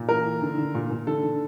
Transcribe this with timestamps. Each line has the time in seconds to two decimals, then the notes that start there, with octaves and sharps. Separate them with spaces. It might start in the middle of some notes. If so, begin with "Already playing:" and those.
Already playing: A#2
0.08 E3 A#4
0.25 E3
0.42 D3
0.58 D3
0.75 A#2
0.91 A#2
1.06 D3 A4
1.23 D3